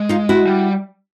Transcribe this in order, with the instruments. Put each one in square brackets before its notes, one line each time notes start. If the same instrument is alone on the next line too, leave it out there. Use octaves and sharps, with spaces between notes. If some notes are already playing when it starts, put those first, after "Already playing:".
Already playing: [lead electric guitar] G#3
[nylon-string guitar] D#4 F4
E4 F#4
[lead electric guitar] G3